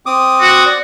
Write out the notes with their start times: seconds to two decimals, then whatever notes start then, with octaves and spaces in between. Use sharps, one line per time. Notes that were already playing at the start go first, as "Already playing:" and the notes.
0.06 C4 D6 D#6
0.41 F#4
0.66 D5